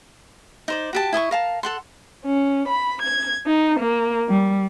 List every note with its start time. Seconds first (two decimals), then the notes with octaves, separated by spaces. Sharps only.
0.68 D#4 C5 D5
0.93 F#4 G4 A5
1.13 E4 D#5 G#5 C#6
1.31 A#4 F5 A5
1.63 A4 F#5 C6
2.25 C#4
2.69 B5
3.02 G#6
3.46 D#4
3.80 A#3
4.30 G3